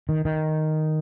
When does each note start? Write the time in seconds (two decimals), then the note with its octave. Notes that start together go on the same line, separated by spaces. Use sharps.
0.09 D#3
0.25 D#3